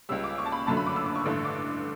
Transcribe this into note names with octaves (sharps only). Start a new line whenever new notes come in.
C#2 C#3 G3 E6
D6
C#6
A5
B5
G1 F#2 D3 F#3 A3 A5
B5
D6
E6
D6
C#6
A1 G2 D3 A3
D6